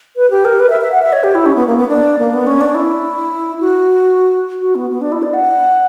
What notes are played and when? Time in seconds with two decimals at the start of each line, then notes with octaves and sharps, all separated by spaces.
0.16 B4
0.30 G4
0.45 A#4
0.60 B4
0.70 E5
0.81 E5
0.92 F#5
1.02 E5
1.13 C#5
1.23 G4
1.35 E4
1.46 C#4
1.56 B3
1.67 A#3
1.77 B3
1.88 D4
2.19 A#3
2.33 B3
2.47 C#4
2.61 D4
2.75 E4
3.61 F#4
4.61 F#4
4.75 B3
4.90 B3
5.01 D4
5.12 E4
5.22 D5
5.33 F#5